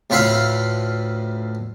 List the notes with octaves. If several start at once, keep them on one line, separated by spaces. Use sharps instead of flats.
D2 A2 F4 B4 E5 F5